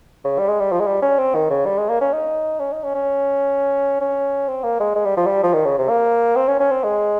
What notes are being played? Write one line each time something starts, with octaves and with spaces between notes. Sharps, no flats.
C#3
G3
G#3
G3
F3
G#3
G3
C#4
C4
D#3
C#3
G3
G#3
A#3
C#4
D#4
C#4
D#4
C#4
C#4
C#4
C4
A#3
G#3
G#3
G3
F3
G3
F3
D#3
C#3
C3
A#3
C4
C#4
C#4
C4
G#3